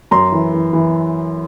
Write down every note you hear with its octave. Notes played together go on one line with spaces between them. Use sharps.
F#2 A#5 C6
E3
E3
E3